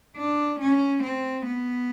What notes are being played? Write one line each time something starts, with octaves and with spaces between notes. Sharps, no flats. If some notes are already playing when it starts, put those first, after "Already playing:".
D4
C#4
C4
B3